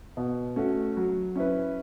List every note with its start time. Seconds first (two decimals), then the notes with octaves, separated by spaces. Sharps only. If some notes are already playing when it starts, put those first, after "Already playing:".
0.17 B2
0.56 A3 C#4 F#4
0.97 F#3
1.36 C#4 E4 B4